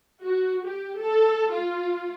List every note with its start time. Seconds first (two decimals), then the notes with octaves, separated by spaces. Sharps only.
0.22 F#4
0.66 G4
0.99 A4
1.52 F4